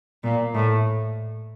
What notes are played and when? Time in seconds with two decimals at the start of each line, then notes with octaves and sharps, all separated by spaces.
0.24 A#2
0.55 A2